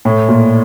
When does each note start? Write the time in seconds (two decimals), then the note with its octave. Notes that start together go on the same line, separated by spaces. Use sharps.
0.05 A2
0.29 A#2